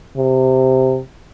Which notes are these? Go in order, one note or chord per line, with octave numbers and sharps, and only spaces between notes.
C3